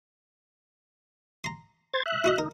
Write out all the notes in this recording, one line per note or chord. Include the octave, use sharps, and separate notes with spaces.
A#5 C6
C5 G#6 A6
E5 F#6
E4 F#4 D#5
D#4 A#4